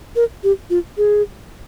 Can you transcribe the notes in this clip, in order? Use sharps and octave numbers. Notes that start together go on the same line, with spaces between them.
A#4
G4
F4
G#4